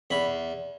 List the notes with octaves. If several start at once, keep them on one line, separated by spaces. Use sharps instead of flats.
E2 B5